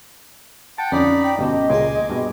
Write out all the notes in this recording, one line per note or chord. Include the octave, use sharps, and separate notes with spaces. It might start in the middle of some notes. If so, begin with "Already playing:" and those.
F#5 G5 A5 A6
F2 D3 C#4 D#4 D5 B5
G5
G1 B2 G4 D#5 A5
C#2 A#2 C#3 G#4 G#5 C6 D6
G2 B2